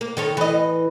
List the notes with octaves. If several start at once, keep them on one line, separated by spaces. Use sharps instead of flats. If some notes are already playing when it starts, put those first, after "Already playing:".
A#3
D#3 A4 C#5
E3 D#5